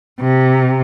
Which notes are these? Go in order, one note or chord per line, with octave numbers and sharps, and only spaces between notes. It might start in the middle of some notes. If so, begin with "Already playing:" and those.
C3